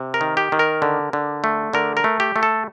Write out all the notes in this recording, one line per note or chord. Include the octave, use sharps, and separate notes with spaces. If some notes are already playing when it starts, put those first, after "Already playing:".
Already playing: C3
A#4
D#3
G4
D#3
A#4
D3
D3
A3
D3 A#4
A#4
A3
G4
A3
A4